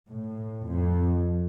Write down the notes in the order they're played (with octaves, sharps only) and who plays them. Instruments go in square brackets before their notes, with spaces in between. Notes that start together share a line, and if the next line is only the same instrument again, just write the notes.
[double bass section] A2
F2